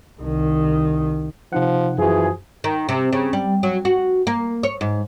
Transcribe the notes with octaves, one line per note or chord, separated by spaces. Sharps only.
C2 D#3
C3 F3 D#4 F#5
F#2 E3 F3 F#4 G#4
D#3
C3
C#3
G3
F#3
F#4
A#3
C#5
G#2